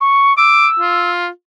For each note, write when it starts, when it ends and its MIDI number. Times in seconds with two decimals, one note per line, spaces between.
0.01 0.36 85
0.37 0.68 86
0.37 1.10 88
0.79 1.28 65